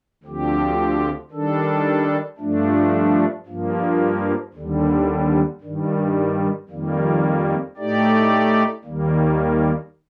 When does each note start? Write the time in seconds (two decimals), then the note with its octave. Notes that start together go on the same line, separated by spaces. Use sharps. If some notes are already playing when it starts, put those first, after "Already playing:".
0.23 D2 D3 F3 C4 G4
1.31 D#3 G3 D4 A4
2.38 G2 F3 A3 D4
3.46 G2 F3 A#3
4.54 D#2 D3 G3
5.61 G2 D#3 G3
6.69 F2 D#3 G3 A#3
7.77 A2 A3 D#4 G4 D5
8.84 D#2 D#3 G3 A#3